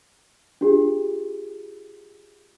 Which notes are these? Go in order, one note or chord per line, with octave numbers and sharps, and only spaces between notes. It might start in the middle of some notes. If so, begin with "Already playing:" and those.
D4 F4 G4 G#4